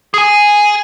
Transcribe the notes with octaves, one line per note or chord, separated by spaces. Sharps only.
G#4 G#5